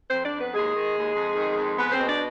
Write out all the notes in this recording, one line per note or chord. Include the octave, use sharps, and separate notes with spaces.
F2 C4 C5
D4 D5
F2
B3 B4
D#2 G#3 G#4
D#3
D#2
F2
D#3
F2
G#3 B3 B4
B2 C4 C5
D4 D5